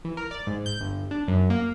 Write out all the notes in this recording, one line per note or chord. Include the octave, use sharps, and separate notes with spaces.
E3
A#4
D5
G#2
G6
G1
D4
F#2
A#3